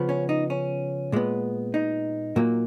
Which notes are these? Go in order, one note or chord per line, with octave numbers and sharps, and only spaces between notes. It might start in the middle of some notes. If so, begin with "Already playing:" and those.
Already playing: C#3 F3 B3
C#4
D#4
C#4
A#2 G#3 B3
D#4
A#2 F#3 A#3